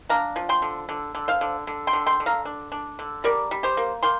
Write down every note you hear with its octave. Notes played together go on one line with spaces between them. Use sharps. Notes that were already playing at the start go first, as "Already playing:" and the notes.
D4 F5 A#5
F3
G5 C6
D3
D3
D3
C5 F5
D3
D3
G5 C6
D3
G5 C6
D3
F5 A#5
D4
D4
D3
G3 A#4 D5
G3
G4 C5
A#3
A#3 G5 C6